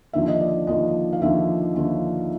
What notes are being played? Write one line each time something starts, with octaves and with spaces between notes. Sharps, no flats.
D#2 D3 F3 E5
D#5
D5
D#2 D3 F3 D#5
F5
D#2 D3 F3 E5
D#2 D3 F3